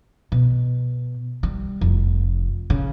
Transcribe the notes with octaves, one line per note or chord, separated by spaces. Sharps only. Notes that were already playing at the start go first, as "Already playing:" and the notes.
B2
G3
F1
C#3